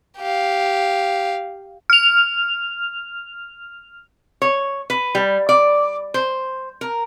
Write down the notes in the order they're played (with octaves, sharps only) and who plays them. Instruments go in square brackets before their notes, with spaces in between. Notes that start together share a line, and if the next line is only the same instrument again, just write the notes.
[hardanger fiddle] G4 F5
[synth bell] F6 F7
[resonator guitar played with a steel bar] C#5
B4
G3
D5
C5
A#4